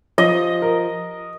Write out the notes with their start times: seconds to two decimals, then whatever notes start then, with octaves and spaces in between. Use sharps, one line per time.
0.18 F3 D#5
0.62 A#4